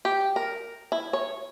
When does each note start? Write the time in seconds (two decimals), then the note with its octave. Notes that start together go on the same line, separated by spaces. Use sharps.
0.05 G4
0.36 A#4
0.92 E4
1.13 C#5